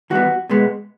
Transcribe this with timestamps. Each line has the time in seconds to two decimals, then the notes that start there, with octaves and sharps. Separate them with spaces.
0.10 E3 G3 B3 F#4
0.50 B2 G#3 B3